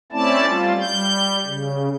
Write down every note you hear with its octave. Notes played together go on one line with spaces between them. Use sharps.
A3 C4 C#4 E4 D5 A5
G3 F4
G3 G6
C#3